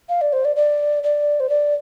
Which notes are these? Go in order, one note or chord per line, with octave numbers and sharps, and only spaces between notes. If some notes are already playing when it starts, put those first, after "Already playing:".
F5
D5
C5
D5
D5
D5
C5
D5